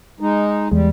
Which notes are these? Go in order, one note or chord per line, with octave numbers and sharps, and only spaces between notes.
G#3 D#4
E2 G3 G#3